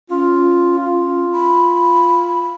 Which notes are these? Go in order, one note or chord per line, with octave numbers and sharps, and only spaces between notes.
C#4 F4
F4
B5